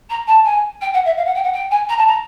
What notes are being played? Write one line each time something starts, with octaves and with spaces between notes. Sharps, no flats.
A#5
A5
G#5
G5
F#5
E5
F5
F#5
G5
F#5
G5
G#5
A#5
A5
A#5